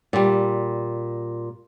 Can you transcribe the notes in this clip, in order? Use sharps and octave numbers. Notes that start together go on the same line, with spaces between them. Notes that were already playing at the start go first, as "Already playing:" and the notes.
A#2 G3